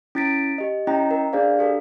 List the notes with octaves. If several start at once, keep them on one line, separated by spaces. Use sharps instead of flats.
C#4 E4 A6 B6 D7
G4 D#5
C#4 E4 D#5 G5 A#5
A#4
D4 G#4 C5 D5 F5
G4 A4 A#4